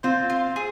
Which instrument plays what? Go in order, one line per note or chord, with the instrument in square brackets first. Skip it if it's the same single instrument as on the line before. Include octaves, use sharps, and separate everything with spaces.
[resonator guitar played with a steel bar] C4 F4 [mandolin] C5
[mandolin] F4
G#4